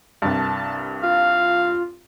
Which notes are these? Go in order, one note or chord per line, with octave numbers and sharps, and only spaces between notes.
C2 G2 A5
F4 F5